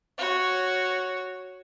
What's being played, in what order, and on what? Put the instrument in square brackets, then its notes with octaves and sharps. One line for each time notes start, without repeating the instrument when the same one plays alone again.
[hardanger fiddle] F#4 C#5